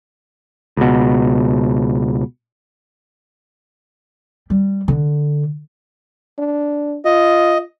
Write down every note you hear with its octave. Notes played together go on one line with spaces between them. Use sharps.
C#2 B2
G3
D3
D4
F4 D#5